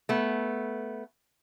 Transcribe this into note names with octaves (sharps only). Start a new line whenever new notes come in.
A3 B3